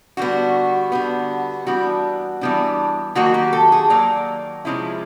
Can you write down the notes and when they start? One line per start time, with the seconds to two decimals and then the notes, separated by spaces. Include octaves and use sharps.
0.17 D3 G3 B3 F#4
0.92 D3 G3 B3
1.67 E3 G3 B3 D4 F#4
2.41 E3 G3 B3 D4
3.15 D#3 F#3 A#3 F#4
3.34 G4
3.53 A4
3.72 G#4
3.90 D#3 F#3 A#3 D5
4.65 C3 F3 G#3 C#4 E4